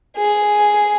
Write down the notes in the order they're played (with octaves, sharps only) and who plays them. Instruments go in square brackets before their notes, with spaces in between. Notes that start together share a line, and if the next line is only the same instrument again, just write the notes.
[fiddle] G#4